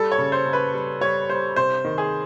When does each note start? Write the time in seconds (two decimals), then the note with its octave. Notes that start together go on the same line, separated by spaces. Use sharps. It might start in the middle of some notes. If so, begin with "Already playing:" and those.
Already playing: G3 A4
0.12 C#5
0.18 C#3
0.32 C5
0.46 C#3
0.53 B4
0.74 G3
1.01 G3 C#5
1.29 G3 C5
1.56 C3 C5
1.85 D#3
1.98 G#4